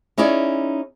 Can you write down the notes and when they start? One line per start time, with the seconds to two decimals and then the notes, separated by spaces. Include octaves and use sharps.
0.18 C#4 D#4 E4 G#4 C#5 D5